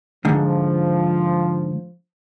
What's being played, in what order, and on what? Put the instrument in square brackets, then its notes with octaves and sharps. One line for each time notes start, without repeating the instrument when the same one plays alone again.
[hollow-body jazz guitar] G#2 D3 [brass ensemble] F3